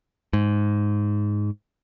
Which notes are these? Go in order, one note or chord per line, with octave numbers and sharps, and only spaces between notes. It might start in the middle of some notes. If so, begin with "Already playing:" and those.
G#2